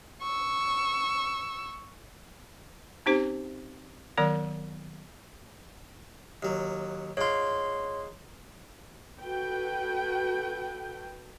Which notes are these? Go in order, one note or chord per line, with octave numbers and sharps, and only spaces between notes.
C#6 E6
C4 C#4 D#4 G4 C5
D#3 F#3 B3 A#4 D5
D#2 F#3
G#2 F4 C#5 C6
F#4 A4 B4 G5